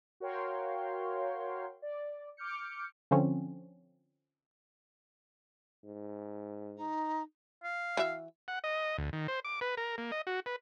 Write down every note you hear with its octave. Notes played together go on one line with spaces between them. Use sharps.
F#4 A#4 C#5 F5 G5 C6
D5
D6 F6 G6 C#7
D3 F3 C4 C#4
G#2
D#4
F5
E3 F#4 E5
F#5
D#5
D2
D#3
C5
D6
B4
A#4
A#3
D#5
F#4
B4